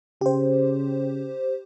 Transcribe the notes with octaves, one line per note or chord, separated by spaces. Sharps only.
C#3 G4 C5